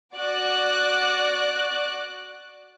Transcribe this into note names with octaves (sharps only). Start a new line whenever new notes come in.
F#4 D5 D6 F#6